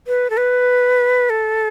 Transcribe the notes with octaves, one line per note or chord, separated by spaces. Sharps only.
B4
A4
B4
A4